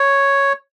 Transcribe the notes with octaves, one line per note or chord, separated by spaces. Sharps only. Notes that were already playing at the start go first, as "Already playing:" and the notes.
Already playing: C#5